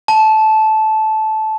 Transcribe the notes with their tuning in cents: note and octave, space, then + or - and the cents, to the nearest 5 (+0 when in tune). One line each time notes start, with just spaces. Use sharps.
A5 -15